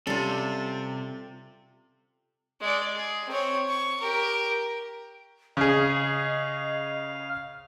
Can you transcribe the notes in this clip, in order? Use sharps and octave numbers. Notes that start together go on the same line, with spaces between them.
C3 G3 C#4 F4 A4
G#3 D5
G#4
C4 C#5
C#6
G4 A#4
C#3 G#4 D#5 F5